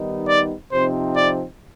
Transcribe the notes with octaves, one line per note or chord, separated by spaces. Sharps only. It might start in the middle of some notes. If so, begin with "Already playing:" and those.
Already playing: D#3 G3 B3 D#4
D5
C3 F3 C4 D#4 C5
D5